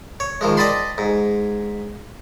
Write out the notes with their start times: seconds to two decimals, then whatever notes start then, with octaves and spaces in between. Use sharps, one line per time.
0.20 C#5
0.41 D#3 F3 G#3
0.57 D5 D#5 G5 A5 B5 C6
0.98 G#2